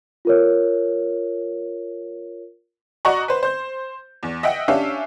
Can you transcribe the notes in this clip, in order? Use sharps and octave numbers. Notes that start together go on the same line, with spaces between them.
F4 A#4 C#5
F#4 D5 D#5 F#5 A#5 C#6
B4 C5
C5 G6
E2
D#5 E5 F#5 G5
C#4 D4 G4 E5 F5